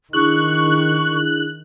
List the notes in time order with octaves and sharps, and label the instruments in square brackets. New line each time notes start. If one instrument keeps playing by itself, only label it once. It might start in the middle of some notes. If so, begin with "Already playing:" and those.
[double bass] D#3 [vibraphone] D4 E4 G#4 [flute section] C#6 [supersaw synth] F#6